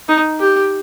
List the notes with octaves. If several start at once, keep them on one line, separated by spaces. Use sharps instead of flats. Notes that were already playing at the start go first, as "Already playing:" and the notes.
D#4
G4